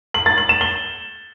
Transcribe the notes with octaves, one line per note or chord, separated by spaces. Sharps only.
F#7
A6
F#7
E7
G7